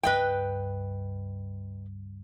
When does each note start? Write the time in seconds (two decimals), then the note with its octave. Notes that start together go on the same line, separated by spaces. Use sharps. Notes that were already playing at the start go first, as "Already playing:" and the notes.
0.03 C#2 G2 B4 D#5 G5